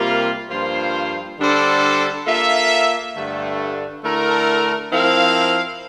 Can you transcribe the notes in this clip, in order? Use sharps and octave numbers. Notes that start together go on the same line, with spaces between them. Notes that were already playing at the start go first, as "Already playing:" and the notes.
Already playing: C3 G3 A#3 F4 A#4
G2 F3 A#3 F4 C5
D3 G3 D4 A4 C5
A#3 F4 A4 E5
G2 D3 A3
D3 A3 E4 A#4
F3 C4 E4 A#4 F5